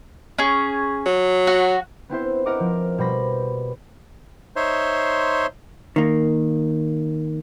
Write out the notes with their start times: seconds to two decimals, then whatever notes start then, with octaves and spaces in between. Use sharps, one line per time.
0.38 C#4 G#4
1.06 F#3
1.47 F#4
2.09 B3 C4 E4 C5
2.46 E4 A#4 D#5 F#5 D6
2.60 F3
2.98 B2 G3 C5 B5 A#6
4.56 D#4 C5 C#5 E5 C6
5.96 D#3 A#3